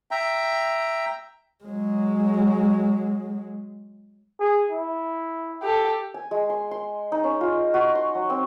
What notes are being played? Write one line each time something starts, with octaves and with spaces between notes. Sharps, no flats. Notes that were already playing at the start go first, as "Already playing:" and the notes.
E5 G5 A#5
F#3 G#3
G#4
E4
G4 A4
G#5
G#3
C6
C6
D#4
C#4
F4
F#4
C6
F#3
C4